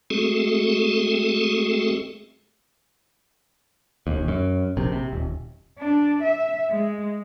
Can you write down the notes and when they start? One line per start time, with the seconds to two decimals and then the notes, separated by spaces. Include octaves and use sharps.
0.10 G#3 A3 C4 F#4 G#4 A4
4.07 E1 D#2
4.28 F#2
4.77 A#1 C3
4.92 C3
5.13 D#1
5.79 D4
6.23 E5
6.70 G#3